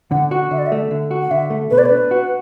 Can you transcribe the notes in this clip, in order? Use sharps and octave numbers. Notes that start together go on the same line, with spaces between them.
D3 F#5
F#4
D3 E5
D5
E5
A3
D3
F#4
F#5
D3 E5
A3
B2 B4
D5
B4
D4
F#4